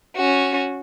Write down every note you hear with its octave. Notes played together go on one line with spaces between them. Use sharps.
C#4 F#4